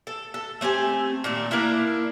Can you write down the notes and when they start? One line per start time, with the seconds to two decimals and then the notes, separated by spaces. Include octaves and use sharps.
0.07 A4
0.34 A4
0.61 A3 C4 G4 G#5
1.24 A#2 D#3 A3
1.51 A#3 D4 E4 A#4